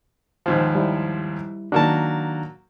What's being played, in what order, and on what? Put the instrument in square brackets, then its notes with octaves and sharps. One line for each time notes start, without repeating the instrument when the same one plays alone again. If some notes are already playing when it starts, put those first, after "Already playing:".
[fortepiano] D#2 G#2 F3
[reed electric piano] G3 E4
[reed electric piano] D#3 D4 [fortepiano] F#3 A#3 A5